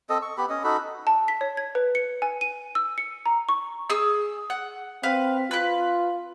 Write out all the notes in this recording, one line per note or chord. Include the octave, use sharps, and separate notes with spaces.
C4 A4 D#5
C#6
B3 G4 B5
C#4 D#5
D#4 F#4 A4 B5
A5
B6
C#5
G#6
B4
C#7
G#5
D#7
E6
C#7
A#5
C#6
G#4 E6
F#5
C4 B4 F5
F4 B4 F#6